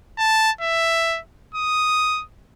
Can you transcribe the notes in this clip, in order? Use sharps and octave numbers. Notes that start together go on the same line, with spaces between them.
A5
E5
D#6